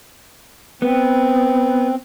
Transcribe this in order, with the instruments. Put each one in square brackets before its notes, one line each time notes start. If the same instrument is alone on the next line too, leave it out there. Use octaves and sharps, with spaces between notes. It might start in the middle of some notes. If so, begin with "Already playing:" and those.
[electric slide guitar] B3 [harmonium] C4